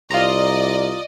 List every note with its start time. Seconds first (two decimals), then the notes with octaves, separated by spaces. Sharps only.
0.11 C2 F4 D5 D#5 A#5